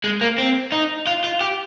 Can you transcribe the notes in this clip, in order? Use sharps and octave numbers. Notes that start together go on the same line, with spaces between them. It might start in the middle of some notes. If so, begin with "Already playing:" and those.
G#3
A#3
C4
D#4
F4
F4
G4